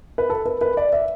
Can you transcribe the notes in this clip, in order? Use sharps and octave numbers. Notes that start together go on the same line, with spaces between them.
B4
A4
B4
B4
D5
E5